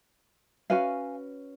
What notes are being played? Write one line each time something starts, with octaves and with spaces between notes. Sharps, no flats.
C#4 F#4 B4 F5 G#5